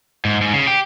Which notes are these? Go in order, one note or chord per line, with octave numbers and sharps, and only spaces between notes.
G#2
G#2
C#3
G4